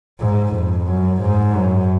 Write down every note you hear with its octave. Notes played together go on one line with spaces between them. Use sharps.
G#2
F2
F#2
G#2
F#2